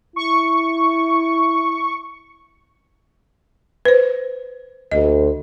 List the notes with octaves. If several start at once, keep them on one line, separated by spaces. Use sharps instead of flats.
E4 C#6
B4 C5
D2 D#5